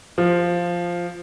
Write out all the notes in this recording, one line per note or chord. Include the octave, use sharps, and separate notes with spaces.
F3